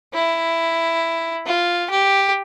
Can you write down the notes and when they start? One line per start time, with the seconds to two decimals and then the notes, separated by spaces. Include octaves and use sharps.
0.14 E4
1.46 F4
1.90 G4